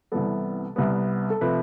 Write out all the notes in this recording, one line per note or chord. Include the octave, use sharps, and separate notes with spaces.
C2 C3 E3 G3 B3 A4
C2 C3 G3 B3
A4
C3 F3 A3 B4